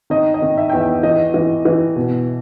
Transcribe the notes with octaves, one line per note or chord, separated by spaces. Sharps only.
D#3 D#5
D#5
D#3
E5
E2 G5
E5
E3 D#5
E3
E3
B2